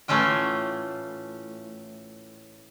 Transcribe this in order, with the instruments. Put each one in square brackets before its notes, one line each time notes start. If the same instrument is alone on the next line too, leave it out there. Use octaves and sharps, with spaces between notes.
[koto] A2 E3 A3 C#4 F4 G5